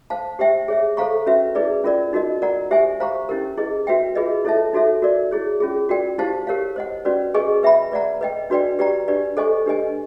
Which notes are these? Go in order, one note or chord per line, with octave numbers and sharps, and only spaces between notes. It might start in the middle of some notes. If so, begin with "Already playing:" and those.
C5 F5 A5
G4 C5 E5 G5
G#4 C#5 E5
A4 C5 F5 A#5 C#6
C#4 F#4 B4 E5
E4 G#4 B4 D5
C#4 F4 A#4 D5
D#4 F#4 A#4 D#5
A#4 D5 F#5 A#5
G4 C5 E5 G#5
C5 F5 A#5 C#6
C#4 E4 G4 A#4
E4 G#4 B4 D#5
F#4 B4 E5 G5
F4 G#4 B4 D#5
E4 A4 C#5 E5 A5
D#4 F#4 A4 C#5 E5
F#4 A#4 D5
E4 G#4 C#5
C#4 F4 G#4
F#4 A#4 D5 G5
E4 G4 C5 F5 A5
G4 A#4 C#5 F5
C5 D#5 F#5
C#4 F#4 B4 D5
G#4 B4 D#5 G#5 C#6
B4 E5 G5 B5
B4 D5 F#5 A#5
B4 D#5 G5
D4 F#4 B4 D5 G5
G4 B4 D5 G5 A#5
D4 G4 B4 D5
A4 C5 D#5 G#5 C#6
D4 G4 B4 D#5 G#5